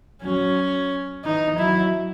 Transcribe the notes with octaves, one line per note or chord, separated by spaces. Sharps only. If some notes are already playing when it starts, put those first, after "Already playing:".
F#3 C#4
E3 D#4
F#3 E4